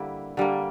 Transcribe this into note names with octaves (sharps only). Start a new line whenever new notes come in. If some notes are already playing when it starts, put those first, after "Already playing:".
Already playing: D3 G3 A#3 E4
D3 G3 A#3